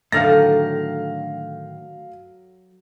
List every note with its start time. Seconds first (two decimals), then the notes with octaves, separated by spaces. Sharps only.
0.12 A2 D3 D#3 F#3 A4 F5 F6 A#6